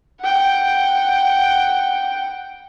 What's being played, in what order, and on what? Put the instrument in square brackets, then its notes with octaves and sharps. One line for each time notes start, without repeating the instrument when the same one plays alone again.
[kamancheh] F#5 G5